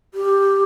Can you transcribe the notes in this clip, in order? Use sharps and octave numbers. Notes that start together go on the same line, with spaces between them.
G4